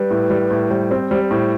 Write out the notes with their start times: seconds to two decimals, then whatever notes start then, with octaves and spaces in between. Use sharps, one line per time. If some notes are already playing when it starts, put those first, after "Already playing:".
Already playing: G3 B4
0.10 A2
0.30 G3
0.51 A2
0.70 G3 C5
0.91 C4
1.11 G3
1.31 A2